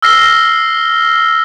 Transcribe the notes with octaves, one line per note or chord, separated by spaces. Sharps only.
E6 F6 A#6 C7 G7